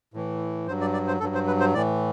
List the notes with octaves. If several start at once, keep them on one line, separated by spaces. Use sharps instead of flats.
A2 E3
G2 F#3 C5
D5
D5
C5
G2 F#3 A4
C5
B4
C5
A2 E3 D5